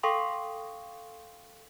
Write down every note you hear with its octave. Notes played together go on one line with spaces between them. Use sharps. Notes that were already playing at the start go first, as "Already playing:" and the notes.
A4 F5 G5 C6 C#6 D#6